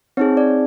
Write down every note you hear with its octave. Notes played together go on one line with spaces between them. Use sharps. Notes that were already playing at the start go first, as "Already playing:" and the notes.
C4 D#4 G#4 C#5
D5